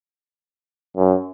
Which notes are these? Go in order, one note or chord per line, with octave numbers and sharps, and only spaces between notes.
F#2